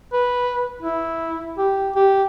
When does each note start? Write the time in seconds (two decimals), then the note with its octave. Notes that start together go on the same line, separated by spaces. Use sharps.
0.13 B4
0.82 E4
1.58 G4
1.96 G4